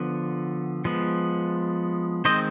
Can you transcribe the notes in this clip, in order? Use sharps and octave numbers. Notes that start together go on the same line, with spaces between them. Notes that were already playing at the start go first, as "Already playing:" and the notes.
Already playing: D3 F3 B3
F3 G#3 B3
D#3 G#3 C4 C5 D#5